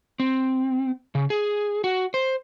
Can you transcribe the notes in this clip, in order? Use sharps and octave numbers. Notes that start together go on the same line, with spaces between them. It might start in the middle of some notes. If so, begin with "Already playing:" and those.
C4
C#3
G#4
F#4
C5